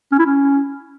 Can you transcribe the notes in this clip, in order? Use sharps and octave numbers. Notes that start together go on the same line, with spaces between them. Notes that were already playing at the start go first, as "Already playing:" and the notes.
C#4
E4
C#4